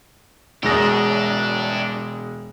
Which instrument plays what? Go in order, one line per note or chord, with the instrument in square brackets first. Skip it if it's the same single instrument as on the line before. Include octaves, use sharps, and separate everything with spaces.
[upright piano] E1 G#3 A#6 [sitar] F#2 [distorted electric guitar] D4 G4